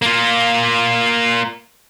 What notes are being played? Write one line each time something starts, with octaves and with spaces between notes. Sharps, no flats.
A#3 F4